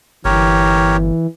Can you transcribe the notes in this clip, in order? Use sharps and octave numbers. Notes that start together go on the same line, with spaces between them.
G1 E3 G4 A#4 C#5